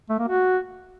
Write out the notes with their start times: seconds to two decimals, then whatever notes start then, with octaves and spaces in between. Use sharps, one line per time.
0.09 A3
0.19 A#3
0.28 F#4